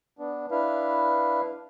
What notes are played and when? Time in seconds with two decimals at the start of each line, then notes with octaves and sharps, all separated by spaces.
0.19 B3 D4
0.51 D4 E4 B4 F5